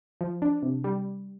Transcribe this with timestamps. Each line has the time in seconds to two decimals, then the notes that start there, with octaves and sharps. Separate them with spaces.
0.21 F3
0.42 D4
0.62 C3
0.84 G3